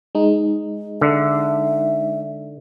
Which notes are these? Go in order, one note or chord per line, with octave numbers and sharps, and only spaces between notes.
G#3 D#4
D3 E5